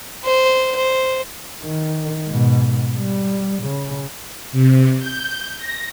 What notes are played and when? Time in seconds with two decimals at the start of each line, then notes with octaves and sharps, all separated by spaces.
0.25 C5
0.76 C5
1.63 D#3
2.27 G#2 B2
2.98 G3
3.63 C#3
4.52 C3
4.98 G6
5.57 A#6